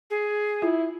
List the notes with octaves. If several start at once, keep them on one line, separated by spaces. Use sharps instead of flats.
G#4
E4 F4